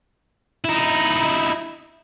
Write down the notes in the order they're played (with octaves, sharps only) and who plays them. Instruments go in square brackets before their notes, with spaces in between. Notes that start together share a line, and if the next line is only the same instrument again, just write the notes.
[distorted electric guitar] D#4 E4